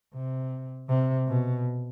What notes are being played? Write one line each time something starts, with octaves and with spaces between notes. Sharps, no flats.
C3
C3
B2